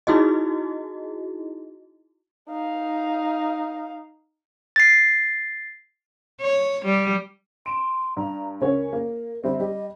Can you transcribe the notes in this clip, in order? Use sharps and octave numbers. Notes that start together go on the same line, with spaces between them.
D#4 E4 F#4 G#4 D#5
D#4 F5
A6 C7
C#5
G3
C6 D7 E7
G2 A#5
C#2 C#4 A#4 C#5
A#3
D3 G3 C4 E5
G3 G4 D#5